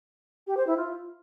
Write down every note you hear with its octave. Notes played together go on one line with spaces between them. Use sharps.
G4
C5
E4
F4